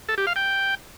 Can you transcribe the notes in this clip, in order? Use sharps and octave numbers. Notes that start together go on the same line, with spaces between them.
A4
G4
F5
G5